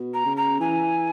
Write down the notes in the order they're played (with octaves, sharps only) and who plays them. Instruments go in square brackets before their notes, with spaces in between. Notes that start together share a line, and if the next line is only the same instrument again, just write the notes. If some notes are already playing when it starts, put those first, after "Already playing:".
Already playing: [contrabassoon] B2
[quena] A#5
[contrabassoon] C#3
[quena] A#5
[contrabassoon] E3 [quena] G#5